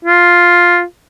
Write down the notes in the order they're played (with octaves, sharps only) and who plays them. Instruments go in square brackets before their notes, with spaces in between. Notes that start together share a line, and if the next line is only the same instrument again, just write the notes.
[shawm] F4